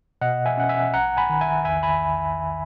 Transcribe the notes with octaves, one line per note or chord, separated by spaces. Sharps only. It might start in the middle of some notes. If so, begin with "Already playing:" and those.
B2 D#5 F#5
E5 G#5
C#4 F#5
E5 G#5
A#1 F#5 A#5
G#5 B5
D#3
E5 G#5
E2 E5 G#5
G#5 B5